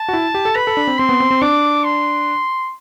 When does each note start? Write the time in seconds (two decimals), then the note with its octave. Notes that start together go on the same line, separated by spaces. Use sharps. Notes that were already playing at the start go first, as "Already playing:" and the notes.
Already playing: A5
0.08 F#4
0.13 E4
0.35 G4
0.45 A4
0.56 B4 B5
0.67 A4
0.77 D4
0.87 C4
0.98 C4 C6
1.09 B3
1.20 C4
1.31 C4
1.42 D4 D6
1.84 C6